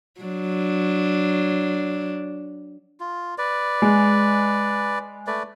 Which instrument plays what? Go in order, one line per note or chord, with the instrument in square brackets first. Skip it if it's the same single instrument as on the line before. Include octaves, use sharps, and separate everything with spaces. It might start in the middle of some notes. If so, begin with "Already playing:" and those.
[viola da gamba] F#3 D4
[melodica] F4
B4 D5
[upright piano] G#3
[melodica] A3 B4 D5